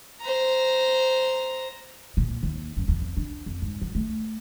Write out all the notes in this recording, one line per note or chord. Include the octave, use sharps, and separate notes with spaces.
C5 A#5
A#2
D#2
F#2
E2
F2
D4
F2
G#2
F#3
A3